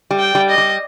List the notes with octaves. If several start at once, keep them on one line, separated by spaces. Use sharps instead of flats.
G3
G5
G3
D#5
G3